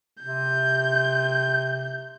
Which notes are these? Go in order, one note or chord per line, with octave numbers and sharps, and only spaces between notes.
C3 G6